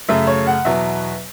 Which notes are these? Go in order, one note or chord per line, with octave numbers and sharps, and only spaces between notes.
F#2 C#3 A3 E5
C#5
F#5
E2 B2 F#3 B3 E5